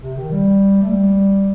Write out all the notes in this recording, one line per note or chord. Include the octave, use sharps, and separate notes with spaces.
C3
D#3
G3
A3
G3